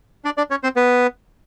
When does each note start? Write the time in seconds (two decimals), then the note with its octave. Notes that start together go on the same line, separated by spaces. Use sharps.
0.25 D4 D5
0.37 D4 D5
0.51 C#4 C#5
0.63 C4 C5
0.76 B3 B4